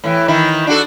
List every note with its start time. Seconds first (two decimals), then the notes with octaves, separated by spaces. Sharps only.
0.04 A2 E3
0.28 D#3 E3 E4
0.67 D4 F#4 A4